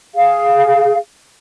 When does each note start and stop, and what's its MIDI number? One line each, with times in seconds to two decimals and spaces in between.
0.15 0.97 68
0.15 0.97 77